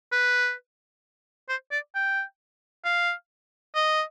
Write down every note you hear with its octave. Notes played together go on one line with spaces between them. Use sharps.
B4
C5
D5
G5
F5
D#5